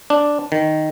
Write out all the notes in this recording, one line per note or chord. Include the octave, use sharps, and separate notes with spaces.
D4
D#3